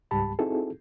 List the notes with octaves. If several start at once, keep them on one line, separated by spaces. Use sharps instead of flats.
C#2 G#2 G3 G4 A5 B5
C4 D#4 E4 F#4 G#4 A4